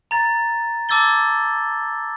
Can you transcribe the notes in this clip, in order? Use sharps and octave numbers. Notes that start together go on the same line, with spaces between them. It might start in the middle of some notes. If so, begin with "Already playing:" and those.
A#5 A6
A5 D6 E6 G#6 A6 G7